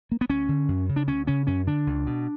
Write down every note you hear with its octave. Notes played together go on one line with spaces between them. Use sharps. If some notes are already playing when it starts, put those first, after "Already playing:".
A#3
B3
D2 C#4
D3
F#2
C#3
D4
D2 C#4
C#3 C#4
F#2 C#4
D3 D4
C#2
B2